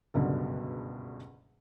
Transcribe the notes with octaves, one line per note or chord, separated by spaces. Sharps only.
F#1 C#2 G2 B2 D3 F#3